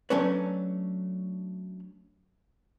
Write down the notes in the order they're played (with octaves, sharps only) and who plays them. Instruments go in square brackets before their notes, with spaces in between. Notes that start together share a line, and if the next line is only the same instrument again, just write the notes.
[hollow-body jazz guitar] F#3 A3 C#4 D4 B4 C#5